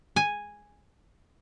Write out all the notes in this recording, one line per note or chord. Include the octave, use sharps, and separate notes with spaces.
G#5